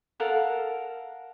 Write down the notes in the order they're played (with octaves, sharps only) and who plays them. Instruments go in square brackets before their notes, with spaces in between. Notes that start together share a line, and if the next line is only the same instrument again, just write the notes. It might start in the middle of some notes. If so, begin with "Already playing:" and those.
[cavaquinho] A4 A#4 F5 F#5